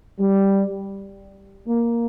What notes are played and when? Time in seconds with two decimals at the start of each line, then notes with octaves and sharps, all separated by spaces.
0.20 G3
1.68 A#3